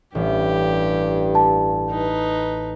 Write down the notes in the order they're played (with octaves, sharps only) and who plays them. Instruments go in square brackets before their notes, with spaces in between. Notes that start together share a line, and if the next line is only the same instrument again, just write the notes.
[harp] A1 [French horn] G2 [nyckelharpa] G4
[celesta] A5
[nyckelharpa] D#4 B4